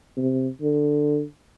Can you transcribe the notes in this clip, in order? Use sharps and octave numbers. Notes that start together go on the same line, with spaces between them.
C3
D3